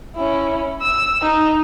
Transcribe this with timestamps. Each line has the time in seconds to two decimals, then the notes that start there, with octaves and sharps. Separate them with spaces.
0.16 C#4 E4
0.82 E6
1.22 D#4